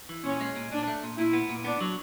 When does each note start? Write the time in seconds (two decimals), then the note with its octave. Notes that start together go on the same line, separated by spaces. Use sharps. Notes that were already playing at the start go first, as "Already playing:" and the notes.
0.09 E3
0.24 A#2 C#4
0.41 G#3
0.56 A#2
0.71 A#2 D4
0.88 A3
1.03 A#2
1.18 A#2 E4
1.33 B3
1.49 A#2
1.65 B3 D4
1.81 F#3